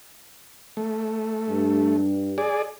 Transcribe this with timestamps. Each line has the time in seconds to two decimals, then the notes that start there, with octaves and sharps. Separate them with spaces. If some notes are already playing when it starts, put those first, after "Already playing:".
0.77 A3
1.48 G2
2.38 G#4 D5